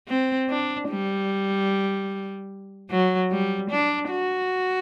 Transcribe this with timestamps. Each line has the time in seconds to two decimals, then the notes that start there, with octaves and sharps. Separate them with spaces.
0.08 C4
0.50 D4
0.89 G3
2.90 F#3
3.31 G3
3.71 D4
4.11 F#4